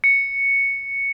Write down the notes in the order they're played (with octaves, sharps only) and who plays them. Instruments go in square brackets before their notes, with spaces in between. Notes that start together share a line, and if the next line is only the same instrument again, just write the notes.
[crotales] C#7